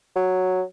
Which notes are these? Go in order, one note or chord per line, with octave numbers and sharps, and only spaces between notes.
F#3